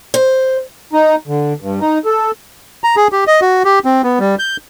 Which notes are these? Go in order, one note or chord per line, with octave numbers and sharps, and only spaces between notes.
C5
D#4
D3
G2
D#4
A4
A#5
G#4
G4
D#5
F#4
G4
C4
B3
G3
G6